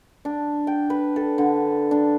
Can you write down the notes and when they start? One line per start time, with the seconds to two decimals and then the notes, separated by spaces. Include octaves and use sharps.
0.25 D4
0.67 G5
0.90 B4
1.16 A4
1.38 D3
1.91 D4